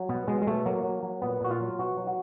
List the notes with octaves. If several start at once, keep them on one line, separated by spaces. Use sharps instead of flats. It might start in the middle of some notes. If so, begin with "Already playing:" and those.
Already playing: F#3
B2 B3
B2 G#3
G#3
B2 A3
F#3 A#3
F#3
F#3
A#2 B3
A#2 F#4
F4
F#3
B2 F#4
F#3
F#4